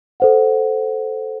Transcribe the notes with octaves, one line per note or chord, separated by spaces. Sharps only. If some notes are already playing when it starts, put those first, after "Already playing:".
A4 C5 F#5